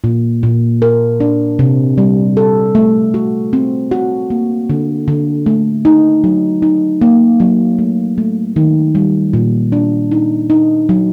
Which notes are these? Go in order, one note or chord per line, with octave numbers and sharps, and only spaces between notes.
A#2
A#2
A#4
D4
C3
G3
A4
A3
F#4
C4
F#4
A#3
D3
D3
A3
D#4
F#3
D#4
A#3
F#3
A3
A3
D#3
G3
A#2
D4
D#4
D#4
F#3